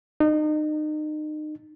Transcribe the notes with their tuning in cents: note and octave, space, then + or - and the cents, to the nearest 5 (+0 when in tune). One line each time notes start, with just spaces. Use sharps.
D#4 -30